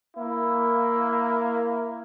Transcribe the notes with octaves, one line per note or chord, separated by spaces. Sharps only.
A#3 E4